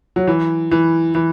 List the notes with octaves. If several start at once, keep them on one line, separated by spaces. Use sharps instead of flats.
F#3
E3
E3
E3